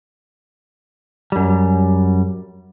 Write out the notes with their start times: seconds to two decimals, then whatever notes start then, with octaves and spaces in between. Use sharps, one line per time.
1.32 F#2 G3